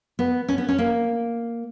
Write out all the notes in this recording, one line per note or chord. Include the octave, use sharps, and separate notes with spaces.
B3
C#4
B3
C#4
A#3